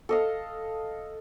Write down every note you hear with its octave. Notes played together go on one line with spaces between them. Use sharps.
A4 D#5 F5